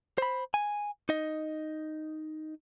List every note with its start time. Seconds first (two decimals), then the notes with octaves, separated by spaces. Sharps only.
0.18 C5 B5
0.54 G#5
1.09 D#4 D#5